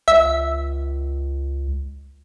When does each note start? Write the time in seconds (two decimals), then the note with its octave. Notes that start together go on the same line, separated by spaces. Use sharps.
0.08 C#2 E5